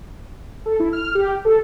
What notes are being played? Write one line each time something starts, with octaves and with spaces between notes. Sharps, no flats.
A4
E4
F6
G4
A4